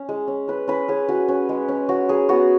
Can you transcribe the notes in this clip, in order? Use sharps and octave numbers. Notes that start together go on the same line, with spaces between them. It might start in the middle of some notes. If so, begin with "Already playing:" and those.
Already playing: C#4
G#3
C#4
C#4 B4
C#4 B4
C#4 G#4
C#4 F#4
C#4
G#3
C#4
F#3 F#4
F#3 G#4
B3 F#4